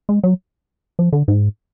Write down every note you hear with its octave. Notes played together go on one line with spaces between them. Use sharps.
G#3
F#3
F3
D3
G#2